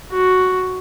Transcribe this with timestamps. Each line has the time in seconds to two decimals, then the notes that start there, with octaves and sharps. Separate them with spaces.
0.12 F#4